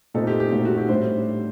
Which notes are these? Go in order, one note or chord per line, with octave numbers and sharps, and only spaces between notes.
A#2 A3 C4 D#4 A4
G4
G4
A#2 A3 C4 D#4 F#4
F#4
G4
A2 G3 D4 C5